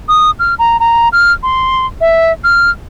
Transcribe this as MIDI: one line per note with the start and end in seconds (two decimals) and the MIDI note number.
0.08 0.31 87
0.39 0.54 89
0.59 0.77 82
0.80 1.09 82
1.13 1.32 89
1.43 1.86 84
2.01 2.32 76
2.44 2.70 89